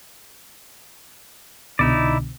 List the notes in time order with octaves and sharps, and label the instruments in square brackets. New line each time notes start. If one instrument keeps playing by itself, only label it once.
[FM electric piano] C2 B2 D3 [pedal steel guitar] D#4 E4 D5